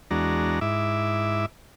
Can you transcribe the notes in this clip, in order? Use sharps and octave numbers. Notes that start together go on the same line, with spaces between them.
E2 G#3 D4 F#4 A#5
G#2 E4 E5 D6